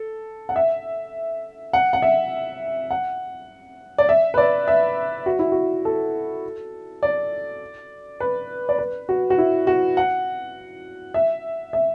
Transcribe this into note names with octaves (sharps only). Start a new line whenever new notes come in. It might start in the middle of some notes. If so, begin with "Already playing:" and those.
Already playing: A4
F#5
E5
F#5
F#5
E5
F#5
D5
E5
B4
D5
E5
F#4
E4
F#4
A4
D5
B4
D5
B4
F#4
F#4
E4
F#4
F#5
E5
E5